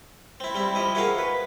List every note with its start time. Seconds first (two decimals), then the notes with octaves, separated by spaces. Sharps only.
0.40 C4 E4
0.55 G3 C4 E4
0.75 F3 E4 D#5
0.95 E4 F#4 G#4 A#4 F5
1.18 B4